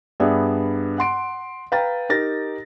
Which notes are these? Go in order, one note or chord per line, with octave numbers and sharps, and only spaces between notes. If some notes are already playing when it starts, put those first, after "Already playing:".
G2 B3 G#4 D5 E5
F#5 C6 D7
B4 F5 G5 A#5 A6
D#4 G4 A#4 A6 A#6